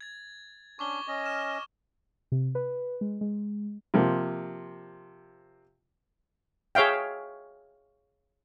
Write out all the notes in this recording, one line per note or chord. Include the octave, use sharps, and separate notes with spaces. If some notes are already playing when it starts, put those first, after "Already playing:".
G#6 A6
C#4 D4 C#6 D6 G7
C#4 D#5
F6 E7
C3
B4
G#3
G#3
C3 F3 A#3
G#4 C#5 E5 F5 G5